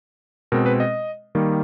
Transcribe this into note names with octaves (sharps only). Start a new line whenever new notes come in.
B2 G#3 C4 A#4
B4
D#5
D#3 G3 A#3